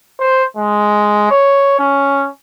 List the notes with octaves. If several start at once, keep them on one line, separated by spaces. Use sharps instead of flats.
C5
G#3
C#5
C#4